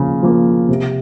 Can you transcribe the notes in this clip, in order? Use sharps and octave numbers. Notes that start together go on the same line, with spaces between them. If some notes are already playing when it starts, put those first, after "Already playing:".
Already playing: C#3 F3 A#3
F3 A#3
C3